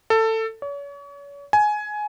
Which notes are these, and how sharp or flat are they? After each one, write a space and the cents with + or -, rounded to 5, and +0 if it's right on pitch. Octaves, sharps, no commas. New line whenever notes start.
A4 +20
C#5 +40
G#5 +15